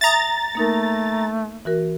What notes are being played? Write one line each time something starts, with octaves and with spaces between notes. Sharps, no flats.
E5 A5 A#5 D#6 A6
A3 A#3 D#4 A#4
E3 F#4 A#4